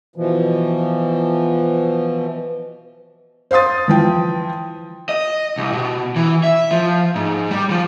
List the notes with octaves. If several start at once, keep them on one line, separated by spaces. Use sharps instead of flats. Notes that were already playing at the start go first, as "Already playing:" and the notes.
B2 E3 F3
C5 F5 C6 D#6 A6
E3 F3 G5
D#5
C2
B2
E3
E5
F3
G#2
G3
F3